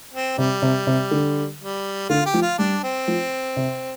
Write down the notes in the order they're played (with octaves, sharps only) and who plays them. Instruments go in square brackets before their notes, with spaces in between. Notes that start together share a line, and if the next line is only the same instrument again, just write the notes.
[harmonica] C4
[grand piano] C3 [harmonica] G3
[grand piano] C3
C3
D3
[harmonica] G3
[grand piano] D3 [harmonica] F4
[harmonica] G4
[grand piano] F3
[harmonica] F4
[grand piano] G3 [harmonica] D4
[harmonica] C4
[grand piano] F3
C3